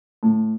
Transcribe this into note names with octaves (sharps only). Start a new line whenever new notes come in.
A2